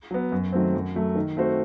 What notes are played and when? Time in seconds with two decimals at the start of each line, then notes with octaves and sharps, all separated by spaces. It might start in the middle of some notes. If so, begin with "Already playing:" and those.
0.11 F#3 B3
0.32 F#2
0.53 D#3 F#3 A3 C4
0.75 F#2
0.96 F#3 A3
1.15 D#3
1.37 A3 C4 F#4 C5